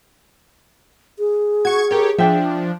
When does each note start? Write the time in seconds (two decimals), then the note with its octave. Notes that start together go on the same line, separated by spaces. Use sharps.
1.19 G#4
1.65 F#4 C#6 G#6
1.91 G4 A4 A#4 C#5
2.18 F3 D4 E5 G5